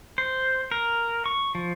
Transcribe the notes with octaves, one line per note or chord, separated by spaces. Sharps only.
C5
A#4
C#6
F3